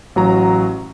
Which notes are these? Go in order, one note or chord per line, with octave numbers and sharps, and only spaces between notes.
A1 F#3 A#5